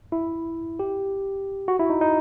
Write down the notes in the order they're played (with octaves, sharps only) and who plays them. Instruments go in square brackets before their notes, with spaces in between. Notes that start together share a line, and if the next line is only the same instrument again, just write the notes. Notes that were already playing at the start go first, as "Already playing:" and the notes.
[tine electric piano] E4
G4
F#4
E4
D#4
D#4